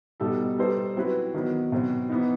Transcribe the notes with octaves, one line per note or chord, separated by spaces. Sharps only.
B2 G3 D#4 A4
G3 D#4 A4 C5
F#3 C4 E4 B4
D#3 F#3 B3
B2 F#3 C4
E3 B3 D#4